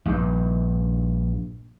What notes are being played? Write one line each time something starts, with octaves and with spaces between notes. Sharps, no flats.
A#1 G2